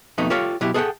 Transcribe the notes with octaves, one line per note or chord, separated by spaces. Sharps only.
F2 B2 A3 D#4
F4 G4 A4 C#5 F5
B2 F#3 E4 G4
G#4 A4 D#5 E5 F#5 G5